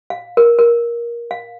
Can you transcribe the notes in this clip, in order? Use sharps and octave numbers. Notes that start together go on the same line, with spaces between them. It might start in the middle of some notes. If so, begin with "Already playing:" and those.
F5
A#4
A#4
F5